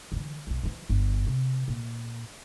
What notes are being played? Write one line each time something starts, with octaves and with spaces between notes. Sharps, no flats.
D3 E3
B1 F2
E3 F3
G1
C3
A#2